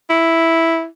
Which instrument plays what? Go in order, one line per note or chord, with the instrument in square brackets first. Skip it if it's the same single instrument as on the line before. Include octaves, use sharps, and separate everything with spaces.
[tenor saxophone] E4